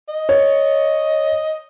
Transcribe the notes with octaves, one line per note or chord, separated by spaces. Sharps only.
D#5
C#5